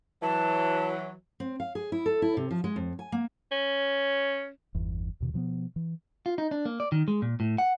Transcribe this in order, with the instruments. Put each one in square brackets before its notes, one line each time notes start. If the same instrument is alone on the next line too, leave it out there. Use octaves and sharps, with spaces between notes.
[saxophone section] E3 F#3 [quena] A5
[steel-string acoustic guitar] C4
F5
G#4
E4
A4
E4
C3
F3
G#3
F2
G#5
A#3
[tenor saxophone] C#4
[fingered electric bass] G1 E2
D#2 B2 D#3
B2 F3 A3 B3
E3
[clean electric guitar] F4
D#4
D4
A#3
D5
D#3
G#3
A#2
A2
F#5